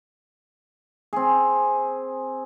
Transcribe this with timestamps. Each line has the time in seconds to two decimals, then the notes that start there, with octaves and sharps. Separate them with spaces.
1.13 C4 G#4